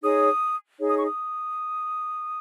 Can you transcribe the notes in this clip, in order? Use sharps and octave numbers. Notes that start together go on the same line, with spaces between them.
D#4 G#4 C#5 D#6
D#4 G#4 C#5
D#6
C#6
D#6